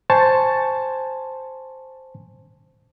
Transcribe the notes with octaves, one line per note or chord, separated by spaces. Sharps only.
C5 G#5 A5 C#6